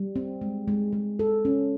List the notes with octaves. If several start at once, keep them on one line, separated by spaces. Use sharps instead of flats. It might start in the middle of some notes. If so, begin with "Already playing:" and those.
Already playing: G3
C4
G#3
G#3
G#3
A4
C#4